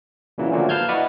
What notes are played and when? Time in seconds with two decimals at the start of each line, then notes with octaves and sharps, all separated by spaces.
0.38 A#2 C#3 E3 F#3
0.52 A#2 D3 F3 F#3 A3 A#3
0.69 B4 F5 A5 F6 G6 G#6
0.88 E4 F#4 B4 D5 D#5 F#5